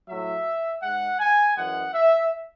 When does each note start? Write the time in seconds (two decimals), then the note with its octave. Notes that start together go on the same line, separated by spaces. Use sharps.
0.08 A2 F#3 E5
0.83 G#2 G#3 F#5
1.19 G#5
1.56 F#2 E3 G#3 F#5
1.94 E5